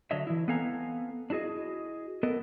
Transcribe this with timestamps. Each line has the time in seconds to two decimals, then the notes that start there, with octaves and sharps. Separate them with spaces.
0.11 D3 F#3 D4 C#5 D#5 E5
0.27 E3 E4
0.48 B3 C4 A4 F5 G#5 A#5
1.30 D4 E4 F#4 G#4 D#5
2.23 B3 A4 A#4 D#5